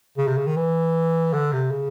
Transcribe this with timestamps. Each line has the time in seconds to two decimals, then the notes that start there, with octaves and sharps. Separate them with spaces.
0.18 C#3
0.28 C3
0.37 C#3
0.47 D#3
0.57 E3
1.33 D3
1.53 C3
1.71 C#3